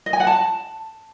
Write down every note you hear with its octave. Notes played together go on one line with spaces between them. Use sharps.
D#5
G#5
F#5
A5